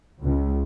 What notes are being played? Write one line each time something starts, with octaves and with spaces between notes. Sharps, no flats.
C#2